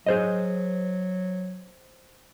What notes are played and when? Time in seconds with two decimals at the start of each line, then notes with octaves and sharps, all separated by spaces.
0.07 F#3 G#4 C5 D#5